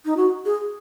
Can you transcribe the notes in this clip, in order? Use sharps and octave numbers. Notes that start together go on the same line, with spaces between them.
D#4
F#4
G#4